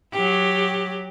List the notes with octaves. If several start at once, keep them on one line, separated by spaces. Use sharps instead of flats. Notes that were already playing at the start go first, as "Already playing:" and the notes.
F#3 G4